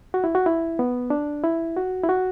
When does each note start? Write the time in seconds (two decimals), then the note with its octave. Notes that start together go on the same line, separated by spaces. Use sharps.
0.14 F#4
0.24 E4
0.35 F#4
0.46 E4
0.79 B3
1.10 D4
1.44 E4
1.76 F#4
2.03 E4
2.09 F#4